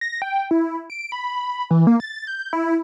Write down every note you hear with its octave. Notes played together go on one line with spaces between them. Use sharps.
A#6
G5
E4
D7
B5
E3
A#3
A6
G6
E4